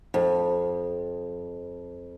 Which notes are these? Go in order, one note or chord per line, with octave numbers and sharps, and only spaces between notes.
F2